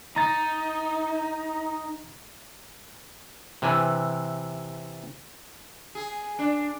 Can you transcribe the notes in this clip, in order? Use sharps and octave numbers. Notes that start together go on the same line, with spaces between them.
D#4 A#5 A6
C3 E3 G#5
G#4
D4